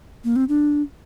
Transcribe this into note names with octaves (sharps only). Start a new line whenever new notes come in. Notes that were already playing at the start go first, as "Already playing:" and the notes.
A#3
C4
D4